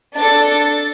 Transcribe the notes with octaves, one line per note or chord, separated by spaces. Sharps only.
D4 A4 A6